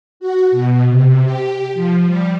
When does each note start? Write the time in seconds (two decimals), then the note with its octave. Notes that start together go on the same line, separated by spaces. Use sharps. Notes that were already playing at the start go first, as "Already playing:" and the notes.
0.20 F#4
0.51 B2
0.89 C3
1.25 G4
1.74 F3
2.06 G3